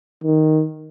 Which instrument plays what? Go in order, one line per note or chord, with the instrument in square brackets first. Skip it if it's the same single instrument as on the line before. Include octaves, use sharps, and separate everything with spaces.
[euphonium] D#3